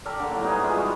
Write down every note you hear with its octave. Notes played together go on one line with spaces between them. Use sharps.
G4 A4 A#4 D5
D3 A#3
A2 F#3 A#3
G3 B3 D#4 G#4
E3 G#3 E4 F4
G3 D#4 F#4